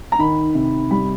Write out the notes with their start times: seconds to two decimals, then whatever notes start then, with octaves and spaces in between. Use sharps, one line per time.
0.12 A#5
0.19 D#3 B5
0.55 C3
0.91 G3 B5